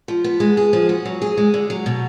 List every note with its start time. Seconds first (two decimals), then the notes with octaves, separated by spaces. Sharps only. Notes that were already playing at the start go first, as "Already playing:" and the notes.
0.08 F3
0.24 B3
0.40 G#3
0.57 G#4
0.73 F3
0.89 F#4
1.05 F#3
1.22 G#4
1.37 G#3
1.54 D3
1.70 F#3
1.86 B2